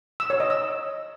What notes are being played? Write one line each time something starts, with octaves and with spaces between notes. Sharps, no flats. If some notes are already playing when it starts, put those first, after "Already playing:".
E6
C#5
D#5
E6